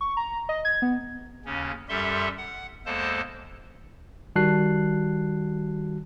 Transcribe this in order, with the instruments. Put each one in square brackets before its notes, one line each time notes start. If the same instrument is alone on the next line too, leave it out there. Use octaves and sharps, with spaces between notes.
[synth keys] C#6
A#5
D#5
G#6
B3
[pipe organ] D#2 C#3 C#4
F#2 G3 G4 A4 E5 C6
F#5
E2 G#3 A#3 A4 C5 A5
[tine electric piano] D#3 G3 F#4 A5 F#6 C7